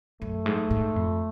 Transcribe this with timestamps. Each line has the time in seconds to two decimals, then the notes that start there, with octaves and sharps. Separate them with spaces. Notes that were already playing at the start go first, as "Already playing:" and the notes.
0.21 F#2 A3
0.46 G#2
0.71 G#2
0.96 F2